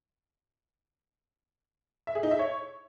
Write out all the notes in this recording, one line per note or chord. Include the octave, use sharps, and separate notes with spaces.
E5
G#4
D#4
E5
C#5